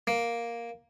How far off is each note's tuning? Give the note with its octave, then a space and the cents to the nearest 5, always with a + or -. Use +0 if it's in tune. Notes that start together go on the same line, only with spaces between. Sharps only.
A#3 +5